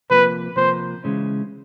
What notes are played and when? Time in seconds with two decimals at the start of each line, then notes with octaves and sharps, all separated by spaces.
0.10 C3 F3 A#3 B4
0.56 C3 F3 A#3 C5
1.04 C#3 E3 G#3 C#4